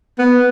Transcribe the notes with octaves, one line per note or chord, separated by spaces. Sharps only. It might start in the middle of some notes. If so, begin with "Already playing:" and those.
B3